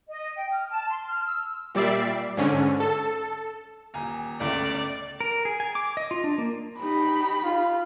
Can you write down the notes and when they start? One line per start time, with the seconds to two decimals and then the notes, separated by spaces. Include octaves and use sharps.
0.09 D#5
0.36 G5
0.52 F6
0.70 A5
0.88 C6
1.07 F6
1.26 E6
1.75 A#2 G3 D5 E5 C7
2.37 G#2 D3 C#4
2.80 A4
3.94 D#1 G#5 A#5
4.40 G1 C#2 A3 D5
5.20 A#4
5.45 G#4
5.60 G#5
5.75 D6
5.97 D#5
6.11 F4
6.24 D4
6.38 A#3
6.81 D#4 G4 B5
7.44 F4